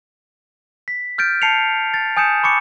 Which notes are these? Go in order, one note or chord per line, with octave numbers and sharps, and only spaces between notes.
B6
F6 G6 A6 D7
A5 C7 C#7 F7
A6
G#5 D#6 G6 C#7 E7
B5 C#6 D6 C#7